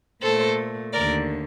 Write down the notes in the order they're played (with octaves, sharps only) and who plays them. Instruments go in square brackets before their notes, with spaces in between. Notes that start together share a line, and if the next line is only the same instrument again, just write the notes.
[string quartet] A#2 A3 A4 C5
D#2 D3 A3 A#4 D5